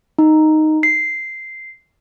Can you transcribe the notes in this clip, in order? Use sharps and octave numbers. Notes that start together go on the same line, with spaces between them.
D#4
C7